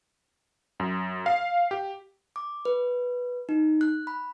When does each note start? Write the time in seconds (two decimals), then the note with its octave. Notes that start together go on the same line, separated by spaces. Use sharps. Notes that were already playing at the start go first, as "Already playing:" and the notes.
0.80 F#2
1.26 F5
1.71 G4
2.36 D6
2.65 B4
3.49 D#4
3.81 F#6
4.07 B5